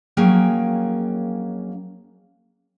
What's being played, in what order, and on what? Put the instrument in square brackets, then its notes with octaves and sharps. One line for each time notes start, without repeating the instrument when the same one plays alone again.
[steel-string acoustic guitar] F2 F#3 A#3 C#4 G#4 G5